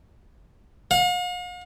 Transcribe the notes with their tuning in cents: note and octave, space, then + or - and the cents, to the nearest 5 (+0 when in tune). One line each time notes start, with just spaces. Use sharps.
F5 +45